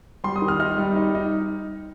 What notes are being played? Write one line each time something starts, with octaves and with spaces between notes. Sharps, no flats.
G3 C6
D#6
D#3
F6
D#4 F6
G3
D#4
D#4